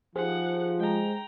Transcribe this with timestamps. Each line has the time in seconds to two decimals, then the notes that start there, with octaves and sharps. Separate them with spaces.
0.16 F3 D#4 G4 G#4 C5 F#5
0.80 G#3 G5 A#5